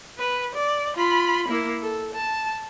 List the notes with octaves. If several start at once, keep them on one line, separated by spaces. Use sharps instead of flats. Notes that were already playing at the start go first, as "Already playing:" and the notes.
B4
D5
F4 B5
A#3 E4
A4
A5